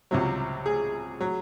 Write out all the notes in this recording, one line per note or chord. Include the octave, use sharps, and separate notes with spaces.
C#2 C3 F#3
G#4
F#3